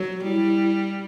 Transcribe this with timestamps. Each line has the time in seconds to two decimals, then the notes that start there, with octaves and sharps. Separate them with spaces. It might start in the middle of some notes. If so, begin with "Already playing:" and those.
Already playing: F#3
0.24 G3 E4